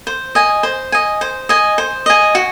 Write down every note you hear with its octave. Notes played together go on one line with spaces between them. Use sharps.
C5
D#5 G#5
C5
D#5 G#5
C5
D#5 G#5
C5
D#5 G#5
F#4